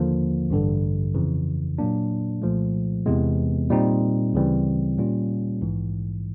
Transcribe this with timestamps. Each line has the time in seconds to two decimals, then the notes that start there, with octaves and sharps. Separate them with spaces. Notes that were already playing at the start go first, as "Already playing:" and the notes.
Already playing: D#2 D3 F3 A#3
0.50 A1 G2 D3
1.14 F2 C#3 E3
1.78 A#2 F#3 A#3 D4
2.42 C2 A#2 F3 A3
3.06 E2 C3 E3 G#3 B3
3.70 A#2 G3 C4 D#4
4.34 D2 C#3 E3 G3 C4
4.98 A#2 G3 A#3 C#4 F4
5.62 A#1 G#2 E3